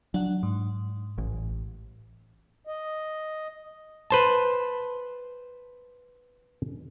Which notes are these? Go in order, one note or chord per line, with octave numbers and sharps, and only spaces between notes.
F#3 D4 F#5
G#2
A1
D#5
B4 C5 A5